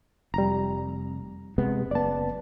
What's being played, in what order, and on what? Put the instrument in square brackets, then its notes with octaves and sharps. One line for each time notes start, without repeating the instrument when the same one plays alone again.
[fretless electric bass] F1 [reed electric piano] G3 A#5
[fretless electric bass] C3 G#3 B3
[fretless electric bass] F#1 B3 [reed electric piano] D5 A5